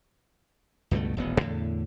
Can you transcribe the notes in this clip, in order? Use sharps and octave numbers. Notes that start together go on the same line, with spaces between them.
C#2 G2 B2 A3
D#1 A1 B3
E2 A2 D3